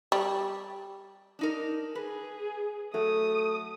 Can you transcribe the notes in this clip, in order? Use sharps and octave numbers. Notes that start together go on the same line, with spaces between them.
G3
D4 D#4 A#4
G#4 B4
F#3 A3 D#6